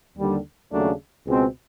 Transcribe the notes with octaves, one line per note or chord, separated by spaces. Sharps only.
D#2 D3 G3
D#2 C#3 F#3 A3 D4
C#2 B2 G#3 C4